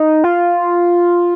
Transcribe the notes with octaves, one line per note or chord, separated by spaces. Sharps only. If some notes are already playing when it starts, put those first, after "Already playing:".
Already playing: D#4
F4